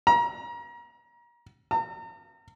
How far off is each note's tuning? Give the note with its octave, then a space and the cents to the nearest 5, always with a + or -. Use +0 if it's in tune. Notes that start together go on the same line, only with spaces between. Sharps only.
A#5 +30
A#5 -40